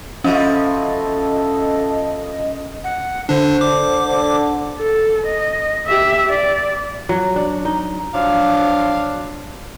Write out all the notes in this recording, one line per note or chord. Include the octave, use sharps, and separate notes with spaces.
F3 C#4 E4 F#4 A4 D#5
F#5
D3 D4 C5
D3 D6
D3
A4
D#5
G4 E5
D5
F#3
D4
D#4
F3 F#3 D4 F5